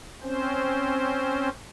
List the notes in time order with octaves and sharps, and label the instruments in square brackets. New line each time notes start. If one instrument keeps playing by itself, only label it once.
[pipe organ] C4 C#4 C5